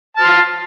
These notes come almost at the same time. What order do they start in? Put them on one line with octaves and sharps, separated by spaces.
A5 F6 C6